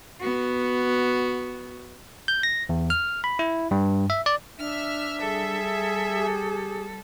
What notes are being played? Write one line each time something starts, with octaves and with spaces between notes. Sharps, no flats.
B3 F#4
G6
A#6
E2
F6
B5
E4
G2
E5
D5
D4 E5 F6
G3 G#4 A4
G4